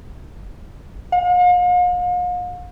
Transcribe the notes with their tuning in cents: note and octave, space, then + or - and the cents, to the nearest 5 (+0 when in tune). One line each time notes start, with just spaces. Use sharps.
F5 +45